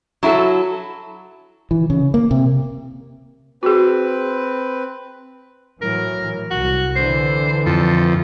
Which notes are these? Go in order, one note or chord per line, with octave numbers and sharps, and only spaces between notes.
F#3 E4 F#4 A4
E3
C#3
A#3
C3
C4 F#4 G#4 B4
A2 E3 F#3 A#4
C2 F#4
D3 E3 C5
F2 A4